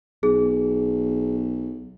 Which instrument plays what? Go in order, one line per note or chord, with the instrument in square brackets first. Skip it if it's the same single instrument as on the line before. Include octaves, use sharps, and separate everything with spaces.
[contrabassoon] B1 [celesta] G#4